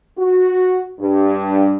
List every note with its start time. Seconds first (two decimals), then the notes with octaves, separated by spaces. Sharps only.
0.17 F#4
0.99 G2